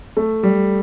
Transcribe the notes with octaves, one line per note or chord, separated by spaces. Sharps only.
A3
G3